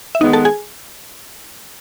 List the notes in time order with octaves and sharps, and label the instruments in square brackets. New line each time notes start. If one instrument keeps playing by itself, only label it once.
[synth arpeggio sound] E5
[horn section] D#3 G#3 B3 [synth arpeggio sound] D#4 D#5
[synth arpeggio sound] A4 A5
G#4 G#5